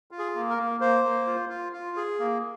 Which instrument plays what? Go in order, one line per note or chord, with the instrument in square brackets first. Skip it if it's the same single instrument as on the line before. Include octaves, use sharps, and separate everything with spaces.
[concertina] F4
G#4
A#3
A#4
A#3
A#3 C5
A#3
F4
F4
F4
G#4
A#3